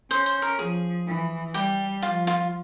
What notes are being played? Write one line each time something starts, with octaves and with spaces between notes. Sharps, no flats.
C#4 C5
C5
A#4
F3 G#4
E3
G3 G4
F3 F4
F4